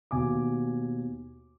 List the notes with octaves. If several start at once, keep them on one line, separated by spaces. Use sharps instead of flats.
D#2 B2 G#5 D6